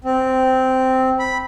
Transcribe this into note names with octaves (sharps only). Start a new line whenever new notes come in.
C4
B5